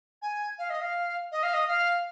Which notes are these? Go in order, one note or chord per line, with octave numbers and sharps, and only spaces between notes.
G#5
F5
D#5
F5
D#5
F5
D#5
F5